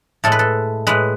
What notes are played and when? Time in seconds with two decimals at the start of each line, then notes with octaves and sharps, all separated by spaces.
0.24 A2 G#3 A4
0.32 B4
0.39 A4
0.87 A2 G#3 B4